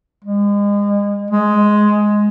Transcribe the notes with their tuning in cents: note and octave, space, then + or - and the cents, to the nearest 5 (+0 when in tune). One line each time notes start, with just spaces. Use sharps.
G#3 -35
G#3 +10